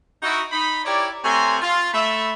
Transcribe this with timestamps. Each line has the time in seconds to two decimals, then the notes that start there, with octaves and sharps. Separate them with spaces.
0.22 D#4 E4 F#4
0.52 D#4 B5
0.84 E4 G4 A#4 C#5 D5
1.24 C3 A3 C#5 G#5 A#5 C6
1.62 F4
1.93 A3 E5 B5